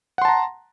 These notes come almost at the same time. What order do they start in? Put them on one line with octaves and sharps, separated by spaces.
F#5 C6 A5 A#5